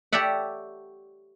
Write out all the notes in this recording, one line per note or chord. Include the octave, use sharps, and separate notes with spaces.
G4 A4 C#5 D5 E5 F#5